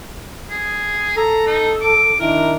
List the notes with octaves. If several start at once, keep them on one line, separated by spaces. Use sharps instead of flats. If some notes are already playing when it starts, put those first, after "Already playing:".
G#4
A4 A#5
D#4
D6
D#3 D4 E4 A#4